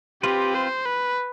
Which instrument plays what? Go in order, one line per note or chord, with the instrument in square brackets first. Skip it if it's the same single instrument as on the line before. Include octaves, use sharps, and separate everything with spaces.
[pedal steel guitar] C4 F4 B4 [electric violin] G4
[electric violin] C5
B4